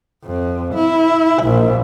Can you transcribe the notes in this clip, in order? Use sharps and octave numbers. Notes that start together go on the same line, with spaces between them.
F2
E4
A#1